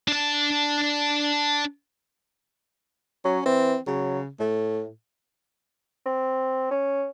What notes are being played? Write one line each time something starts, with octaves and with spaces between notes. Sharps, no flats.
D4 A5
F#3 C#4
E3 C4
C#3 F#3
A2 A3
C4
C#4